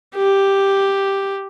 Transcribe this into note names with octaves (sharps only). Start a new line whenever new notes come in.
G4